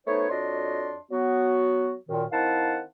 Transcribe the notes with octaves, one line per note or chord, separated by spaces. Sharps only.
A3 B3 D#4 C5 C#5
F2 D4 F#4 C#5 D#5 C6
F#3 B3 F#4
F#2 A#2 D#3
D#3 C4 E4 F5 F#5 A5